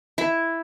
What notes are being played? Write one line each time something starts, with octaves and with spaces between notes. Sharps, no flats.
E4